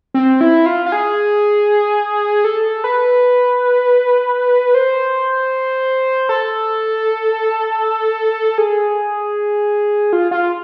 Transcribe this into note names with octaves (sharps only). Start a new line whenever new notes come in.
C4
E4
F4
F4
G#4
A4
B4
C5
A4
G#4
F4
F4